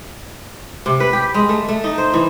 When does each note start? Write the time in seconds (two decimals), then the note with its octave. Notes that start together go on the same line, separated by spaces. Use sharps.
0.86 C3
1.00 B4
1.13 G4
1.34 G#3
1.49 A3
1.69 A3
1.84 D#4
1.98 C5
2.14 E3